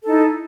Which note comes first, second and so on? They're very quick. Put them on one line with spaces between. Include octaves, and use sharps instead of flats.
A4 D#4 E4